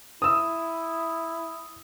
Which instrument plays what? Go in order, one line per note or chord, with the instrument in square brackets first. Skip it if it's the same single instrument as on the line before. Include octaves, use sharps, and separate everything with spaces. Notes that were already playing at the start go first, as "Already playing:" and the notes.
[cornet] E4 [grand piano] D#6 E6